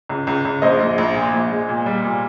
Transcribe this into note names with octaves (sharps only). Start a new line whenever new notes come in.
C#2
C#2
C#2
A#1 C5 D#5
A#1
A#1
A#2
A#1
G#3
A#2
G3
A#2